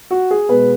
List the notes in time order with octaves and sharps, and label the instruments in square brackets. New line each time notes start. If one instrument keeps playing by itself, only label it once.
[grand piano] F#4
G#4
B2 G#3 B3 B4